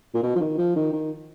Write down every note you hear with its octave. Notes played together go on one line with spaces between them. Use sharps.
A#2
B2
F3
D#3
F3
D#3
D#3